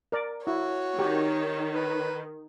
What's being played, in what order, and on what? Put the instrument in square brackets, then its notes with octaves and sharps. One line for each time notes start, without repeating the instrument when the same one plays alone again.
[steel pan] A#4 D5
[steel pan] E4 [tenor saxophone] F#4 [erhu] C#5
[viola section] D#3 [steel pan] G4
[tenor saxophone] B4